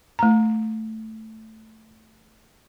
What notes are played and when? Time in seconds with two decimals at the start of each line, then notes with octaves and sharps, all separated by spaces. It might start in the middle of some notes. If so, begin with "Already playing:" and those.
0.19 A3 A#5